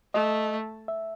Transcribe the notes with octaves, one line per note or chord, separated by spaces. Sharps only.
A3 D#5
E5